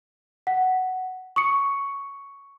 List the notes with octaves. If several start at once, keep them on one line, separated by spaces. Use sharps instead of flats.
F#5
C#6 D#6 C#7